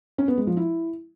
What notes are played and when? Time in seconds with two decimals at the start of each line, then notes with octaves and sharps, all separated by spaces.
0.18 C#4
0.28 B3
0.38 G#3
0.47 F3
0.57 E4